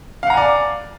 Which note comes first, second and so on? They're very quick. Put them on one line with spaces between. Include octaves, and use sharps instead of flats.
F5 F#5 A#5 G#5 D5